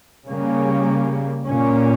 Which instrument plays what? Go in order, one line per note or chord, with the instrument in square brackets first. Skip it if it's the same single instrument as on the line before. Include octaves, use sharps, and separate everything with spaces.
[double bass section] C#3 G3 A#3 C#4
A#2 A#3 C#4